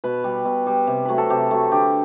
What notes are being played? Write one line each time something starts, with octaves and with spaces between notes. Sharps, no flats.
B2 B4
G3
B2
G3
C3
F#3 A3 B4
A4
C3 G4
F#3 A3
D3 G4